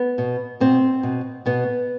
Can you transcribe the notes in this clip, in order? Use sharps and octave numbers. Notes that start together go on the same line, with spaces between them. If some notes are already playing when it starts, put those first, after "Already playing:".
Already playing: B3
B2
B2 C4
B2
B2 B3